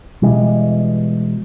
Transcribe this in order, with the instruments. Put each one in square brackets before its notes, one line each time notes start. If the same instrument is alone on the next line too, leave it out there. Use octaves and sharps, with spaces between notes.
[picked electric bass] B2 E3 G3 G#3